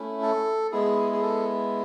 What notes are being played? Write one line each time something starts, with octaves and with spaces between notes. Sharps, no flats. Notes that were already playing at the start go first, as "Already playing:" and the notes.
Already playing: A3 C#4 E4
A4
G#3 B3 E4 G#4
G#4
A4